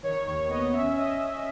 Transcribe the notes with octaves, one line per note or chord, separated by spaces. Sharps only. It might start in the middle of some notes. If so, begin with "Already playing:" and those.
D#3 C#5
D#2 C#5
B3 D#5
C#4 E5
C#4 D#5